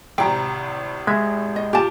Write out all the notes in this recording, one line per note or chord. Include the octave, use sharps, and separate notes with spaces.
G#1 A2 C3 G5 A#5
G#3 E5
D#5
A#2 G4 A5